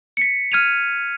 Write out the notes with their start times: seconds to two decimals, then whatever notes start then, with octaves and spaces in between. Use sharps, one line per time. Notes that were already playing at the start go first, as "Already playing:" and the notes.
0.17 B6 C#7
0.52 F6 G#6 D#7 F7